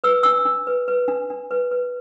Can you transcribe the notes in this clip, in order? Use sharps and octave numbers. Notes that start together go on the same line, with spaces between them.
B4 E6
D4 E6
D4
B4
B4
D4
D4
B4
B4